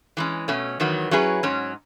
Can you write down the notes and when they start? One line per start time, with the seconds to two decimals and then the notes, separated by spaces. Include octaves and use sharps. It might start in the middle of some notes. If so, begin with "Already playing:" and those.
0.17 E3 G#3 C#4
0.48 B2 A3 C#4
0.80 E2 D#3 F#3 B3
1.11 F#3 C#4 E4 G#4 B4
1.43 G#2 F#3 C#4